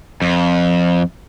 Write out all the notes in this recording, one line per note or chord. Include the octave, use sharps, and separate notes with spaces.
F2